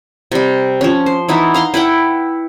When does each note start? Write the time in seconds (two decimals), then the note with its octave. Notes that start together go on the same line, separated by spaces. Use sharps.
0.32 C3 G3
0.81 F3 C#4
1.06 C5
1.29 E3 B3 D#4 E4
1.54 F5 A#5 C6
1.74 E4 B4 F#5 G5